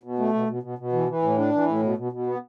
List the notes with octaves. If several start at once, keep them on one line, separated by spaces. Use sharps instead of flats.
B2
A3
B2
B2
B2
B2
E3
E3
A2
D4
E3
A2
B2
B2
B2
B3